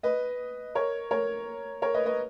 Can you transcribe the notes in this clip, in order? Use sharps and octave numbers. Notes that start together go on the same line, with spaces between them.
B4 D#5
A#4 C#5
A#4 C#5
A#4 C#5
B4 D#5
B4 D#5